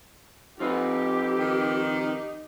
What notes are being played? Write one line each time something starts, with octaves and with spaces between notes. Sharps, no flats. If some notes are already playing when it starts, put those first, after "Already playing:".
F3 C4 D#4 G4 B4
D#3